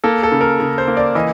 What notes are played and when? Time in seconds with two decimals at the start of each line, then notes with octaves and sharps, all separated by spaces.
0.04 A#3 A4
0.23 A4
0.32 C#3
0.41 A#4
0.60 C#3
0.78 C5
0.88 A#3
0.97 D5
1.15 E3 D#5